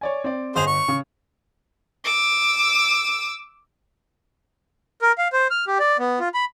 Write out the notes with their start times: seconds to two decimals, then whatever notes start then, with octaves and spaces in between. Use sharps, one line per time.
0.01 C#5 D5 G#5
0.24 C4 D5
0.56 G1 G#4 C5 D#5 F7
0.67 C#6
0.88 C#3
2.04 D6 E6
5.02 A#4
5.18 F5
5.33 C5
5.51 F6
5.67 G4
5.79 D5
5.99 B3
6.20 F4
6.34 B5